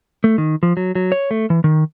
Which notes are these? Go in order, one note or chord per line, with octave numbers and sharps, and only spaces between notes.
A3
D#3
F3
F#3
F#3
C#5
A3
E3
D#3